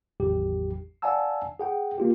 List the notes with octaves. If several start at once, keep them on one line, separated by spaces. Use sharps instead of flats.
G#1 E2 A2 F#3 G4
D5 F5 F#5 G#5 A5 E6
G#4 F#5 G5
A#3 F4 G4